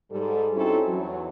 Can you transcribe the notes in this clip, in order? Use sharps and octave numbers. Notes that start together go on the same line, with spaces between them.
G#2 G3 A4
C4 C#4 D#4 E4 F#4 A4
E2 F#3